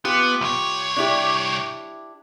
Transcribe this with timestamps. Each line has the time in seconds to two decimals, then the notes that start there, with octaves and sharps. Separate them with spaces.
0.05 B3 F4 G4
0.41 C2 C#5
0.97 D4 E4 G4